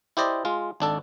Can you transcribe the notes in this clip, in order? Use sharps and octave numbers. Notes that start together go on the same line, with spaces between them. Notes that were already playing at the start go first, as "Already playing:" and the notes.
E4 G4 C5 D5 D#5
G#3 F4
G#1 D4 A4